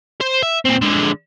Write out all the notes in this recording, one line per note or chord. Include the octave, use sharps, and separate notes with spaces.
C5
E5
A#2 C4
D3 G#3